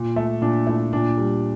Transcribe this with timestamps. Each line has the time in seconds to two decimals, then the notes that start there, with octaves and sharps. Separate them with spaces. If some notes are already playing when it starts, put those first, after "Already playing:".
Already playing: A#2
0.16 A3
0.42 A#2 D4
0.67 A3 E4
0.93 A#2 D4
1.18 G3